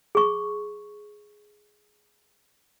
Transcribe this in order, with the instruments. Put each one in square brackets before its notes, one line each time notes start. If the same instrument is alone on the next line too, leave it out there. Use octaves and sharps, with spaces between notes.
[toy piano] G#4 C#6